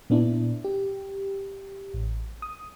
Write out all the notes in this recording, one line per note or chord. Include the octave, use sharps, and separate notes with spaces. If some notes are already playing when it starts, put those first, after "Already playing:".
A#2 B3 D4 E4
G4
A1
D#6